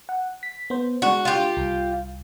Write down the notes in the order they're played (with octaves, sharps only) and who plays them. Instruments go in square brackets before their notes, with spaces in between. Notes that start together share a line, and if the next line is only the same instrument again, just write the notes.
[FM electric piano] F#5
B6
B3 C5
[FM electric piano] G#3 D4 [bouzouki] F#4
[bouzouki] F4 G4
[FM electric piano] C2